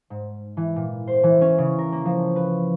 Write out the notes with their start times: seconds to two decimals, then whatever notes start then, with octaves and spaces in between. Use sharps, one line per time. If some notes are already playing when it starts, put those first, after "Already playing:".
0.10 G#2
0.57 E3
0.76 A#2
1.07 C5
1.23 E3
1.41 C#4
1.58 C#3
1.78 A#4
1.92 A#3
2.05 F3
2.36 B4